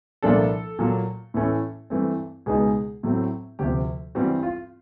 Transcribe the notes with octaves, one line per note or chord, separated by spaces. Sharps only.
C2 A#2 F3 A#3 D4 A4
A#2 F#3 A#3
A2 E3 A3 C#4
G2 E3 A3 C4
C#2 B2 G#3 B3 D#4 G#4
A2 F#3 A3 C4
D2 C3 F3 G4
G2 E3 G3 C4 F#4
F4